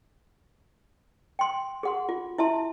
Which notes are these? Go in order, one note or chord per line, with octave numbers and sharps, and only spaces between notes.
G5 C6
G#4 F#5 C6
F4
E4 E5 A5 C6